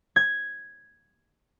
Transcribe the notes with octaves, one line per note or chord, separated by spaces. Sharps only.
G#6